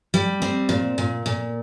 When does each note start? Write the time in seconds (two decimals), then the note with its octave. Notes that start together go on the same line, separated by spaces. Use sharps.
0.14 G3
0.42 C4
0.69 A#2
0.98 A#2
1.26 A#2